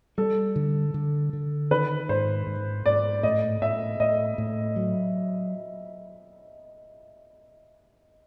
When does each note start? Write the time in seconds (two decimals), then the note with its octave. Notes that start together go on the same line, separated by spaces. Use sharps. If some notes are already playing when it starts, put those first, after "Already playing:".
0.18 G3 A4
0.56 D3
0.94 D3
1.33 D3
1.71 D#3 B4
2.09 G#2 C5
2.47 G#2
2.86 G#2 D5
3.23 A2 D#5
3.61 A2 E5
4.00 A2 D#5
4.38 A2
4.76 F#3